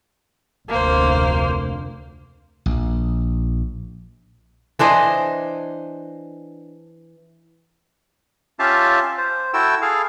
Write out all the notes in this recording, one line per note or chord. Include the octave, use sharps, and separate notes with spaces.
F1 D2 A#3 C5
A#1
E3 D4 C5 D#5
C#4 F4 G4 E5 F5 A5
C5
E4 F#4 A4 G5 E6
G#4 A4 F5